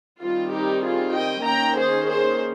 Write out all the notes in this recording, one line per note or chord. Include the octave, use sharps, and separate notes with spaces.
D#3 G3 C4 F4
D#4 G4
F4 G#4
D#5 G5
D#3 A#3 C#4 G5 A#5
G#4 C5
G#4 C5